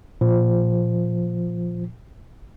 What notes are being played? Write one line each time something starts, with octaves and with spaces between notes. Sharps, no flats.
A#2 F3